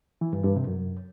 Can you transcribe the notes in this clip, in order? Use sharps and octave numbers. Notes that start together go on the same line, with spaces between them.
E3
G2
G2
C3
F#2